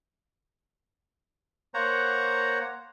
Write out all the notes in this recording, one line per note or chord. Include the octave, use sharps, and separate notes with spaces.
A#3 C5 C#5 F#5 A#5